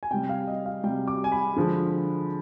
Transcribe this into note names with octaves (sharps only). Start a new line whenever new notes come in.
G#5
C3 G3 G5
F5
D#5
F5
C3 G3 G5
D6
G#5
B5
D3 F3 G#3